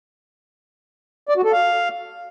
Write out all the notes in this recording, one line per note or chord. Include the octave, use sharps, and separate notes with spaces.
D5
F#4
A4
F5